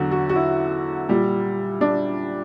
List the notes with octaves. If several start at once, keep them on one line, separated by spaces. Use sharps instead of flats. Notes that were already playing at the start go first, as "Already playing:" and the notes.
Already playing: E2 D3 F#3 F#4
F#4
F#4
E4
A#2 G3
D4